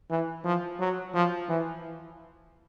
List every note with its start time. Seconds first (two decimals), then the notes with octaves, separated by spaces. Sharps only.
0.09 E3
0.44 F3
0.79 F#3
1.14 F3
1.49 E3